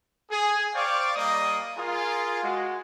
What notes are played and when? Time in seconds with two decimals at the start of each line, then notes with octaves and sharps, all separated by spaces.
0.31 G#4
0.74 C5 D5 F5 G5 C#6 D6
1.15 G3 A#3 D#5 D#6
1.76 F4 G#4 A#4
2.43 G#3 F#4